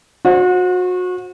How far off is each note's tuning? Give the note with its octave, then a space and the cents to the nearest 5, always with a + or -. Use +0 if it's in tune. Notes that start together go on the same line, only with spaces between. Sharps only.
F#4 -30 C5 +20